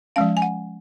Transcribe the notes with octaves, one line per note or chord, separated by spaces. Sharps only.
F3 G#3 C#4 F5
G#5
F#5